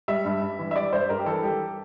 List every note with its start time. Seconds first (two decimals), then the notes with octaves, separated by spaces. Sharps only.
0.08 G3 E5
0.25 G2
0.42 G2
0.59 E3
0.71 E5
0.75 G3 D5
0.92 G2 C5
1.09 G2 A#4
1.19 G4
1.26 E3 A4
1.43 G3 G4